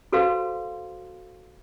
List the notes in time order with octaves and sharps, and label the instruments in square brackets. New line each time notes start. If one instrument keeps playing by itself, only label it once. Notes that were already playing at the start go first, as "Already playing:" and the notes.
[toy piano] F#4 A4 B4 C5 F5 C6